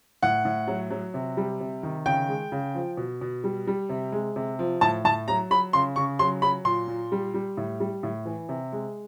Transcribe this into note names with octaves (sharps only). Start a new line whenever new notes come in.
A2 F#5
A2
F#3
F#3
C3
G3
C3
D#3
C#3 G5
G#3
C#3
F3
B2
B2
G3
G3
C3
G#3
C3
F3
A2 A5
A2 A5
F#3 A#5
F#3 B5
C#3 C6
C#3 C#6
F#3 C6
F#3 B5
A#2 C6
A#2
G3
G3
A2
G3
A2
E3
C3
G#3